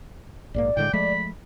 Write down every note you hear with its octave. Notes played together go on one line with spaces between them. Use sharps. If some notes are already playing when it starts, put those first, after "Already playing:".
A#1 G#2 A#3 D5
A2 D3 G#3 G5
F3 G#3 A3 B5